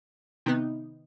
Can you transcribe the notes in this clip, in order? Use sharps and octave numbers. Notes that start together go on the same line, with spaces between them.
C3 D#3 B3 D#4